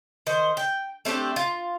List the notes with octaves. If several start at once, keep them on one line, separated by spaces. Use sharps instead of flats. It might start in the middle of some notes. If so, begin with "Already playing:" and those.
D#3 C5
G5
A3 C4 D4 G4
F4